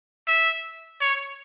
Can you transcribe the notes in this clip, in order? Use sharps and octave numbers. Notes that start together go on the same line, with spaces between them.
E5
C#5